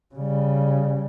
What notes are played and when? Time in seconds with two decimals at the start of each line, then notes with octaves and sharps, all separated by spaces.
0.15 C#3 G3